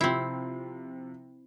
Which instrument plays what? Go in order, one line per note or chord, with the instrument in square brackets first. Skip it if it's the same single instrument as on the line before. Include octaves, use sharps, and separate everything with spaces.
[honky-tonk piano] C3 F3 C7 [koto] C4 E4